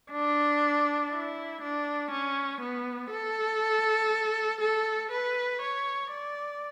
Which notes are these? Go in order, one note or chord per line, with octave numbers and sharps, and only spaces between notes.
D4
E4
D4
C#4
B3
A4
A4
B4
C#5
D5